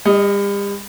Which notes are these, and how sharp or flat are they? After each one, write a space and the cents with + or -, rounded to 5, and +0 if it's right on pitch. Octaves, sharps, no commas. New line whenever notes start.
G3 +40 D#5 +0